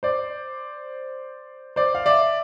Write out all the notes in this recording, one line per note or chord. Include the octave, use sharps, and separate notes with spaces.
C5 D5
C5 D5
F5
D5 E5